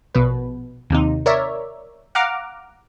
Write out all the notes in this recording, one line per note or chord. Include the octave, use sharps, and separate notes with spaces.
A#1 B2 B4
D#2 C3 D#4
A#4 C#5 D5 E5
F5 F#5 A#5 D6 F6